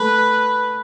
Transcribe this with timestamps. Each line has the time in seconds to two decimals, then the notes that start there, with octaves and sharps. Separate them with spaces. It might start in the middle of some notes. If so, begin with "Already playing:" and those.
Already playing: A3 B4